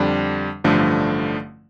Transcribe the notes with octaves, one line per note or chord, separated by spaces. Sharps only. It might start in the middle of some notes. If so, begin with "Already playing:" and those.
Already playing: F2 D3 G3 D4
A1 G2 D3 F3 A3